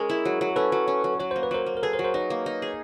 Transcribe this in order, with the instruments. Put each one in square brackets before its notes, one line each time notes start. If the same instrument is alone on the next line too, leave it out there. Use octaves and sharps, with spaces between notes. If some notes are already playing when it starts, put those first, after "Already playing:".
Already playing: [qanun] G#3 C#4 [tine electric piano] G#4 A#4
[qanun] E4
F#3
F#3
[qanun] C#4 [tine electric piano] A4 B4
[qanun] F#3
C#4
F#3
[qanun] F#3 [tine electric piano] C#5
[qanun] A#3 [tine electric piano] C5
[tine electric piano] B4
[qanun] F#3 [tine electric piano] A#4 C5
[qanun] A#3
[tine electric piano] A#4
[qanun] G#4 [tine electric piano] A4 B4
[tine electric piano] A#4 C5
[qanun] F#3
[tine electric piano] A#4 C5
[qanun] D#4 [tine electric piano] B4 C#5
[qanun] A#3
D#4
G#4